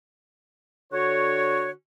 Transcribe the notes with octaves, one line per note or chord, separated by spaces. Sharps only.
D3 F#4 C#5